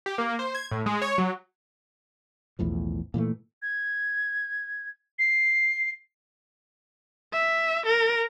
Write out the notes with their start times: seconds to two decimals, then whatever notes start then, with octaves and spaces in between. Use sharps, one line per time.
0.06 G4
0.18 A#3
0.39 C5
0.55 G#6
0.71 A2
0.86 G#3
1.02 C#5
1.18 F#3
2.59 B1 E2 A2 F3
3.14 A#2 E3 F#3 A3
3.62 G#6
5.19 C7
7.33 E5
7.86 A#4